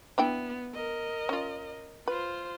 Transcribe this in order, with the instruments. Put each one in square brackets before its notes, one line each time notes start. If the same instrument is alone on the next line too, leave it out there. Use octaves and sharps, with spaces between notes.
[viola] B3 [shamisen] D4 E4 G5
[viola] A#4 D#5
[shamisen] C#4 F4
[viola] F4 C5 [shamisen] B4